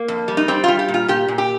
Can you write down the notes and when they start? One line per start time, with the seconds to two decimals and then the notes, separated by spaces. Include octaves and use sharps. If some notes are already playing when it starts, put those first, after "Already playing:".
Already playing: A#3
0.08 F2
0.28 G3
0.37 D#4
0.48 G3 C4
0.64 G3 F4
0.79 G4
0.88 A#2
0.94 F4
1.08 A#2 G4
1.28 A#2
1.38 G4